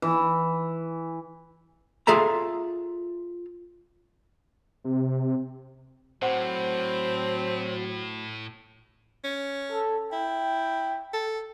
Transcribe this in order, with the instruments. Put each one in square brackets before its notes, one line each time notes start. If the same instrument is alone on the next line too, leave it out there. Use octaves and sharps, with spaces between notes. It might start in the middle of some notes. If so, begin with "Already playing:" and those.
[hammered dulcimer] E3
[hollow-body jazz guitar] F4 G#4 A4 E5 A#5
[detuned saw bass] C3
[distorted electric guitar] A2 [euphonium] F#3 [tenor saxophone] C4 [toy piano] C5 F#5 D6
[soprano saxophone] C#4
[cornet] A4
[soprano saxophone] E4 [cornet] G5
[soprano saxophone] A4